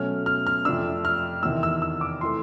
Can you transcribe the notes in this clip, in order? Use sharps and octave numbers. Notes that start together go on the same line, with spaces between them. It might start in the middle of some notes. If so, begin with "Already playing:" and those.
Already playing: B2 F#3 A3 C#4 F6
F6
F6
F2 C3 F3 A3 D4 E6
F6
E2 C3 D#3 E6
E6
E6
D6
E3 A3 C6